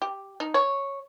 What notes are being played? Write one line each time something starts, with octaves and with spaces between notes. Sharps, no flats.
G4
D#4
C#5